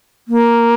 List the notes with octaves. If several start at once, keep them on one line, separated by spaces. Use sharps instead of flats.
A#3